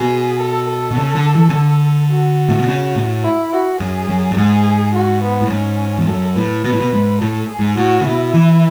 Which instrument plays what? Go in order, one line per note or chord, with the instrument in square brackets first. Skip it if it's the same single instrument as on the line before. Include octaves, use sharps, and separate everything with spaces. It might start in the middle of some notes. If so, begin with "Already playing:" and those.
Already playing: [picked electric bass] B2 [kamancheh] G#4
[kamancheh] A4
A4
[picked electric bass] B2
C#3
D3
E3
C#3
D3
[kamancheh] F#4
[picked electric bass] A2
B2
C#3
A2
[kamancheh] E4
F#4
[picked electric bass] F#2 [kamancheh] G#4
[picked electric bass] F#2
F#2
[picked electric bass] G#2 [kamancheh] G#4
[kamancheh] F#4
B3
[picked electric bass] A2
[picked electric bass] G#2 [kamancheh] C#4
[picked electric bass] E2
[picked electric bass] F#2 [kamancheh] A4
[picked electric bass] A2 [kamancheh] B4
[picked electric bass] B2 [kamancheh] B4
[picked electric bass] A2
B2
G#2
[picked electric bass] A2 [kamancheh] A4
[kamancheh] G#4
[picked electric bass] G#2
[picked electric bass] A2 [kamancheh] F#4
[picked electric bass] C#3
[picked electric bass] B2 [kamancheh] E4
[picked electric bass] E3